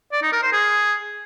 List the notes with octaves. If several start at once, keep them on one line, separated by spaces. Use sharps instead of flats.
D5
D#4
A#4
C5
G#4